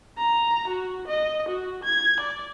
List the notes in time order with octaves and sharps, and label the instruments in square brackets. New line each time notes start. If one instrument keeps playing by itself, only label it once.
[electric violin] A#5
F#4
D#5
F#4
G#6
D5